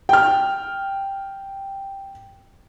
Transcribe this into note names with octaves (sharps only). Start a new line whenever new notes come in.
G5 F6